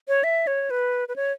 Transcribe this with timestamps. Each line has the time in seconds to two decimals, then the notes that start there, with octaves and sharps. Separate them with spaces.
0.08 C#5
0.24 E5
0.47 C#5
0.70 B4
1.08 B4
1.16 C#5